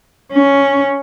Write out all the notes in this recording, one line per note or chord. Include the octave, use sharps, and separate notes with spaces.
C#4